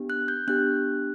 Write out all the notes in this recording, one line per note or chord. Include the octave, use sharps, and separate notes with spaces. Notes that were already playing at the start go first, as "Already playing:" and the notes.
Already playing: B3 D4 G4
F#6
G6
B3 D4 G4 F#6